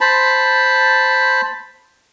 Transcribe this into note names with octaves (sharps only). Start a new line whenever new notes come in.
C5 A5 B5